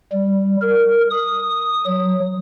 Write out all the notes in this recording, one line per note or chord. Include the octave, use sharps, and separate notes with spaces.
G3
A#4
D#6
F#3